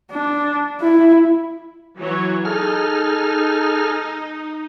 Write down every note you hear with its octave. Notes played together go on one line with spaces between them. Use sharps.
D4
E4
E3 F#3 C#5
D#4 G#4 A4 F6